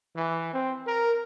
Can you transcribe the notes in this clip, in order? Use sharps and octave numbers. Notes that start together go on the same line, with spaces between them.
E3
C4
A#4